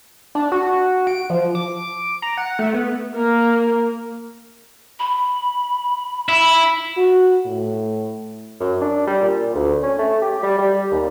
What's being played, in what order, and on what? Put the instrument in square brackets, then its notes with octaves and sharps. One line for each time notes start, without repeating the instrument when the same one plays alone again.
[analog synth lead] D4
F#4
D7
F3
D6
A#5
F#5
A3
B3
[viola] A#3 A#4
[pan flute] B5
[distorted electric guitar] E4 [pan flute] B5
[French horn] F#4
A2
[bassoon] F#2
D4
G3
A#2
D2
C#4
A3
G4
G3
G3
D#2